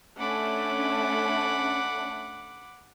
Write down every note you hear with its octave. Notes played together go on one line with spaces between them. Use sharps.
A3 C#4 D4 F#5 B5 D6